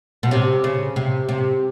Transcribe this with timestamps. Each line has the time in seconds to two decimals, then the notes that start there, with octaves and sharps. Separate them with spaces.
0.23 B2
0.31 C3
0.64 C#3
0.96 C3
1.29 C3